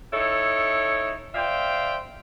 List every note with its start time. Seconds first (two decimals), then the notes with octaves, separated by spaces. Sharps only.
0.13 D#4 E4 A4 C#5
1.34 C5 D5 E5 F5 G5